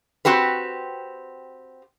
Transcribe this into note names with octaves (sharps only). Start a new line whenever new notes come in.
C4 F#4 G4 B4